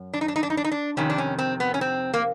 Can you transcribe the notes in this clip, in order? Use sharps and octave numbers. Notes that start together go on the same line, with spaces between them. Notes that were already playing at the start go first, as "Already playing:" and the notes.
Already playing: F#2
D4
D#4
D4
D#4
D4
D#4
D4
D#4
D4
F2 C3 D#3 C#4
D4
C#4
C4
B3
C#4
C4
A#3